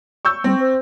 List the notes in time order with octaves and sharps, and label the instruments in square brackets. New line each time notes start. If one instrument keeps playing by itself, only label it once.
[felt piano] C#6 E6 G6
[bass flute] G3 [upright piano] C4
[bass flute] C5